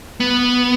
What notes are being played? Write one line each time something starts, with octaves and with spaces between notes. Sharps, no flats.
B3